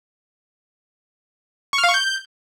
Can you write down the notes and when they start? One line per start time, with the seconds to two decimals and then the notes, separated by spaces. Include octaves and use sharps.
1.73 C#6
1.78 F6
1.84 F5
1.89 C#6
1.94 G6